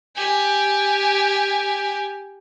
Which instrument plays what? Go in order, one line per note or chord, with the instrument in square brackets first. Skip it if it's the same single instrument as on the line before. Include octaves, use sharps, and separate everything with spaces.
[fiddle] G4 G#5